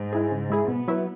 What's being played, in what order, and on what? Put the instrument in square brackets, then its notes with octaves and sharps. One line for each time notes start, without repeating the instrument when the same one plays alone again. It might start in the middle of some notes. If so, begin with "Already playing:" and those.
Already playing: [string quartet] G#2
[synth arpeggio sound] G#3 E4 G#4
C#3
G#3 E4 G#4
[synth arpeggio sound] B2 [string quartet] B3
[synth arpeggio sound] F#3 E4 B4